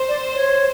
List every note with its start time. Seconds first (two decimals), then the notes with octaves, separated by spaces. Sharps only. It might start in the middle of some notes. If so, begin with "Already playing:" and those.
Already playing: C5
0.08 D5
0.35 C#5